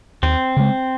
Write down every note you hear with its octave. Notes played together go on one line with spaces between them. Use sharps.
D#2 C4
C#3 G#3